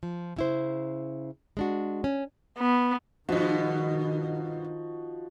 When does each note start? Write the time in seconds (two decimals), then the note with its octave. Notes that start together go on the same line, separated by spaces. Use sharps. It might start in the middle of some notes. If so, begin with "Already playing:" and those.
0.03 F3
0.36 C#3 E4 C5
1.57 G#3 D4 F#4
2.04 C#4
2.58 B3
3.29 G2 B2 D#3 F3 D#4 F#4